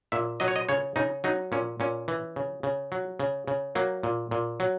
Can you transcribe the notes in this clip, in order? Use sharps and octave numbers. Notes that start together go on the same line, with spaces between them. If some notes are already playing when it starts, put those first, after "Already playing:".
A#2 E5
F#3 D#5
C#5
D#5
C#3 C#5
C#3 D#4
F#3 D#4
A#2 C#4
A#2 C#4
E3
C#3
C#3
F#3
C#3
C#3
F#3 A#3
A#2
A#2
F#3